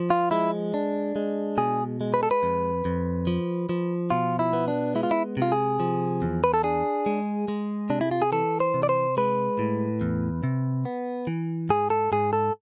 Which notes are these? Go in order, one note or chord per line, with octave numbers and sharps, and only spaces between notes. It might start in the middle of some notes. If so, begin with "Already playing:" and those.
Already playing: F3
F4
G#3 E4
D4
G#3
B2 G#4
G#3
B4
A4
B4
F2
F2
F3
F3
B2 F4
E4
B3
D4
G#3 E4
F4
E4
C3 F4
G#4
F3
E2
B4
A4
D4 G#4
G#3
G#3
C3 D4
E4
F4
G#4
E3 A4
C5
C3
D5
C5
G#3 B4
A2
E2
C3
B3
E3
G#2 G#4
A4
G#2 G#4
A4